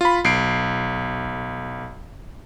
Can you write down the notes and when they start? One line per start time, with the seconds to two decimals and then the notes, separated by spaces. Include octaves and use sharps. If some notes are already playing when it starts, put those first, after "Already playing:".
0.01 F4 B5
0.24 B1 C7 D7